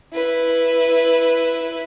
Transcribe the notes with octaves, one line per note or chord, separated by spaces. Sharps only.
E4 B4